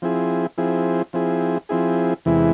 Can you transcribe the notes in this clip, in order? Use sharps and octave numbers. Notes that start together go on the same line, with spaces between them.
F3 C4 E4 G#4
F3 C4 E4 G#4
F3 C4 E4 G#4
F3 C4 E4 G#4
E2 C3 E3 G#3 E4